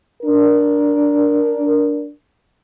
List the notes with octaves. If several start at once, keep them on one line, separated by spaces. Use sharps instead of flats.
D4 A#4